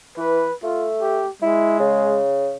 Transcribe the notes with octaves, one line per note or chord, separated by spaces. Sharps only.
E3 B4
A3 F4
G4
G#3 E4
C#3